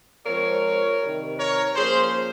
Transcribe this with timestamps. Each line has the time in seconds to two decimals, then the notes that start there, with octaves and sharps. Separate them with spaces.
0.26 F3 G#3 C4 A#4 C#5
1.01 C3 D#3 G3
1.38 A#4 C#5
1.75 F3 A#3 C#4 G#4 C5